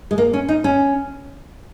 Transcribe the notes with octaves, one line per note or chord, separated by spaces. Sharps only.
G#3
A#3
C#4
D#4
C#4